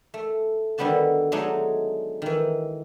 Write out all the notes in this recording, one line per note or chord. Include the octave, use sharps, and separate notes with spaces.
A3
D3 D#3 G3 B3 F#4 A5
F#3 G#3 A3 D4 D#4
D#3 E3